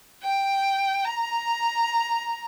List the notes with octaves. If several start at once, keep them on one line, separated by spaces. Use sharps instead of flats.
G5
A#5